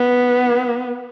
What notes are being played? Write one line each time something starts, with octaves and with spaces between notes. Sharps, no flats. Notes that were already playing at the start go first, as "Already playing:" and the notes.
Already playing: B3